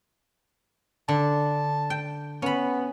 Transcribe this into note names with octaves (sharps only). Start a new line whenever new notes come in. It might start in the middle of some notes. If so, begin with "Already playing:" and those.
D3 A5
G5
B3 C#4 B5